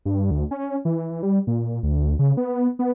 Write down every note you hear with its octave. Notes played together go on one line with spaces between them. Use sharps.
G2
D2
C#4
E3
G3
A#2
D2
C#3
B3
B3